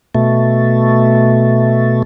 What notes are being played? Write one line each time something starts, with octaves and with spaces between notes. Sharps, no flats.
B2 A3